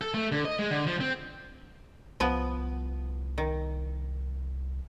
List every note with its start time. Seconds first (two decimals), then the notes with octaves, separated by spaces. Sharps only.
0.01 A4
0.14 A3
0.32 D3
0.45 D#5
0.59 G#3
0.71 D3
0.87 F3
1.01 C4
2.20 C2 F3 B3
3.38 D#3